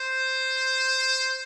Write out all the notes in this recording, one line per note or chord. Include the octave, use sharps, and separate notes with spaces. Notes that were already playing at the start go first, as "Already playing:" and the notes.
Already playing: C5